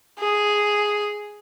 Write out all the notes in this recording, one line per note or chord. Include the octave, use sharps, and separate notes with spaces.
G#4